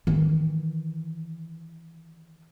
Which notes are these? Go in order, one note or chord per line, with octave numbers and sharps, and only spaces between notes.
D#3 E3